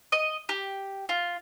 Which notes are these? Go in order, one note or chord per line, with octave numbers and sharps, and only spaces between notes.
D#5
G4
F4